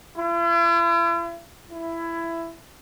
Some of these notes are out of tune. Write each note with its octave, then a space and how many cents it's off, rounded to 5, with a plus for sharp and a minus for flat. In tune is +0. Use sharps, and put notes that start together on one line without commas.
E4 +45
E4 +15